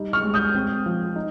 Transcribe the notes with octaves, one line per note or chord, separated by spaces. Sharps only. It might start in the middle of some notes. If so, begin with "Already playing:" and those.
Already playing: G3 D#4
C#6 F6
G#3
D#6 G6
C4
F3
D#4